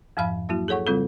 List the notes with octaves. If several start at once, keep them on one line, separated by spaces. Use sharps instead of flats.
F2 G#2 F3 F5 B5
F#3 A#3 E4 F#4
G#4 A4 C#5 F#5 C#6
C#3 G3 C4 F4 A4